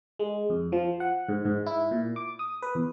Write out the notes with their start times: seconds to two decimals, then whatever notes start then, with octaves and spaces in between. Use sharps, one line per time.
0.19 G#3
0.50 F2
0.72 F3
1.00 F#5
1.28 G#2
1.45 G#2
1.66 E4
1.91 A#2
2.16 D6
2.39 D#6
2.62 B4
2.75 E2